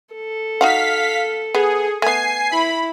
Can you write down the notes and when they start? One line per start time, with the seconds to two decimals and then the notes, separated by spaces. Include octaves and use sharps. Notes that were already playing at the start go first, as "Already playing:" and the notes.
0.14 A4
0.61 D#4 F#4 F5 F#5 B6
1.55 B3 G#4
2.02 A3 B3 G#5 C7
2.52 E4 B5